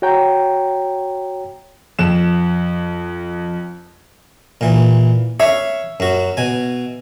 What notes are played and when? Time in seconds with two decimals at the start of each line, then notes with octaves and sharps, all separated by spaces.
0.02 F#4 C#5 G5 A#5
1.99 F2 E7
4.61 A#2 E3
5.40 C#5 E5 F5
6.00 F#2 F#4
6.37 B2 G#5